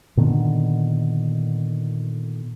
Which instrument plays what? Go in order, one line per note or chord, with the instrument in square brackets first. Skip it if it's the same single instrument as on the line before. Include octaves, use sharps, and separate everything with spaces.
[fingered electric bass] A#2 D3 D#3 B3